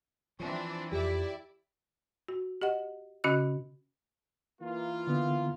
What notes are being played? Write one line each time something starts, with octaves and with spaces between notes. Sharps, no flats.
E3 F3 C4 D4
F2 F3 E4 G4 D5
F#4
G4 D#5 F#5
C#3 C#4 F#4 D#5 F#6
E3 A#3 F4
D3 B3